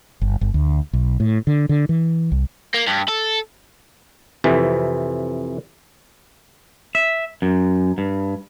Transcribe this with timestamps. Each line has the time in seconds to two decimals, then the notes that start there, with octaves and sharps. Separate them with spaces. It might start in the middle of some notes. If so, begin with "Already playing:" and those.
0.21 G1
0.41 G1
0.54 D2
0.93 B1
1.20 A2
1.47 D3
1.69 D3
1.89 E3
2.32 C2
2.74 A#3
2.87 G2
3.09 A4
4.44 F2 C3 E3
6.95 E5
7.42 F#2
7.98 G2